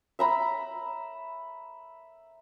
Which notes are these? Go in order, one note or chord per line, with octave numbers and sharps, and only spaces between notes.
E5 A#5 B5